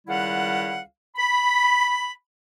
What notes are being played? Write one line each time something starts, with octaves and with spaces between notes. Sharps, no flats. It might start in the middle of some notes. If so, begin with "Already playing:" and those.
C#2 D#3 G3 E4 F5 F#5
B5